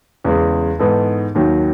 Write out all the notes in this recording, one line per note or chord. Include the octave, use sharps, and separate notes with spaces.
E2 C#3 G#3
G#2 E3 B3 D#4 A4
D#2 D#3 F#3